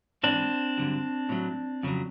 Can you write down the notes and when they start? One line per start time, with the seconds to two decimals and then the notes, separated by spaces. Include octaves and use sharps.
0.23 G#2 E3 G#3 C4 D4
0.77 G2 D3 F#3
1.29 A2 F#3
1.83 F2 C#3 F#3